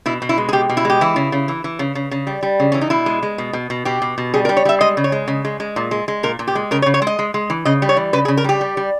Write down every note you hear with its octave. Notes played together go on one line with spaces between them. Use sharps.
B2 E4
B2
E4
G#3
G#4
B2 G4
B2
E4
G#3 G4
E3 E4
C#3
C#3
E3
E3
C#3
C#3
C#3
G3
G3
C#3
E3 C#4
D#4
B2 E4
G#3
G#3
B2
B2
B2
B2 G4
B2
B2
G3 G#4
A#4
G3
C#5
G3 E5
G#3 D#5
C#3
C#5
G#3
C#3
G#3
G#3
A#2
G#3
G#3
A#2 A#4
A#2
G4
G#3
C#3 A#4
C#5
C#3
C#5
G#3
D#5
G#3
G#3
E3
C#3 D#5
G3
C#5
E3
C#3 B4
G#4
C#3
A#4
G3 G4
G3
G3